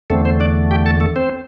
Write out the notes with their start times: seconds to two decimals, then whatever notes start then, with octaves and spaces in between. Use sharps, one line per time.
0.10 E2 D3 A3 C4 A4
0.25 C4 C5
0.40 D4 D5
0.71 G4 G5
0.86 A4 A5
1.00 A3 A4
1.16 C4 C5